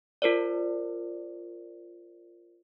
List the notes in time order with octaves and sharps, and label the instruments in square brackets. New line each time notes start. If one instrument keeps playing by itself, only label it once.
[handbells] F4 A#4 C5 D5